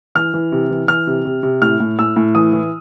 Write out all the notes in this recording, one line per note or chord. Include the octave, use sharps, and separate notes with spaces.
E3 F6
E3
C3
E3
E3 F6
C3
C3
C3
A2 F6
A2
A2 E6
A2
E3 D#6
E3